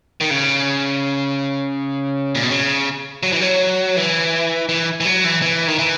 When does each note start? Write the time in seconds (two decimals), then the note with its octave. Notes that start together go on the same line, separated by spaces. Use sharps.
0.21 D#3
0.30 C#3
2.35 A#2
2.43 B2
2.50 C#3
3.23 F#3
3.32 E3
3.41 F#3
3.97 E3
4.69 E3
5.00 E3
5.06 F#3
5.24 E3
5.42 E3
5.68 D#3
5.79 E3